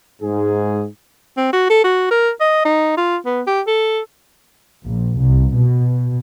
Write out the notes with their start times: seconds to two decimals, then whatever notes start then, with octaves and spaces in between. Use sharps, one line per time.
0.22 G#2 G#4
1.37 C4
1.53 F#4
1.70 A4
1.84 F#4
2.11 A#4
2.40 D#5
2.65 D#4
2.97 F4
3.25 B3
3.47 G4
3.67 A4
4.84 A#1
5.18 C2
5.54 B2